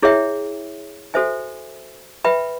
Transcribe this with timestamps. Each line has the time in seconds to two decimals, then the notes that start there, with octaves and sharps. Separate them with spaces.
0.02 E4 G#4 C#5 E5 G5
1.14 F#4 A4 C5 E5 G#5
2.24 B4 E5 G5 B5